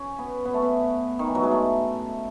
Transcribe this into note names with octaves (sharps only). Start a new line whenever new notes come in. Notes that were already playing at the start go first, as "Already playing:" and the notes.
Already playing: C#4
B3
B3
A3
B3
D#3
E3
F#3
G#3
A3